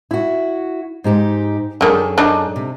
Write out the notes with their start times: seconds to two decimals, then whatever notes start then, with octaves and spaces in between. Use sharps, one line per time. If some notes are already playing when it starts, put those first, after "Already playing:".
0.11 E4 F#4
1.04 G#2 D#4 G4
1.81 F#2 D3 D#3 G#4 A4
2.18 D4 D#4
2.56 C3